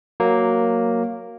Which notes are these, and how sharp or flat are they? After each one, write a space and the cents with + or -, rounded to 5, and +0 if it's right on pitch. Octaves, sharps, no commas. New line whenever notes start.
F#3 +0 A#3 +0